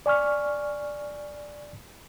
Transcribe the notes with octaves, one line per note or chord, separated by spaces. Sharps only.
D5 G#5 C#6 F6